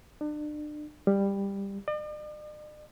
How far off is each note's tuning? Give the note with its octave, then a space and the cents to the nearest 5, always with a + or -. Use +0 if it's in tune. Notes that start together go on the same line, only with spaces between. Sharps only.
D4 +35
G3 +15
D5 +45